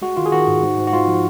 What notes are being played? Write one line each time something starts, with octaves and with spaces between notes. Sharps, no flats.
G#3 F#4
D#3 F4
G#4
D#3 F#4
G#2
G#2
G#2
F#4
G#2 F4
F3